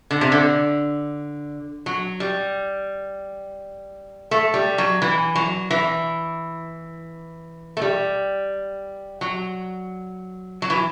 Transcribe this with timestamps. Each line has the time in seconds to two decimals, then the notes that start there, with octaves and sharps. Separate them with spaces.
0.11 D3
0.21 C3
0.32 D3
1.86 F#3
2.20 G3
4.31 A3
4.54 G3
4.78 F#3
5.02 E3
5.35 F#3
5.71 E3
7.77 A3
7.82 G3
9.21 F#3
10.62 F#3
10.70 E3